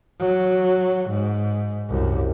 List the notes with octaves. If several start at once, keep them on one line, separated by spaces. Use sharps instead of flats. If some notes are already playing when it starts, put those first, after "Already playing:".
F#3
G#2
C2 F#2